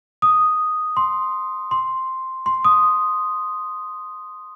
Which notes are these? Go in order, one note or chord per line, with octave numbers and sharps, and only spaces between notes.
D#6
C6
C6
C6
D#6